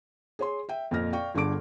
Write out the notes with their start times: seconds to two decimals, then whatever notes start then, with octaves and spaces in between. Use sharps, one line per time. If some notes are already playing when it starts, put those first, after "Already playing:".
0.39 G#4 C#5 C6
0.69 E5 G5
0.91 F2 A#2 C4 D#5 F6 A#6
1.13 D5 F5 G5 C#6
1.35 G1 D3 G#4 A5 D6 D7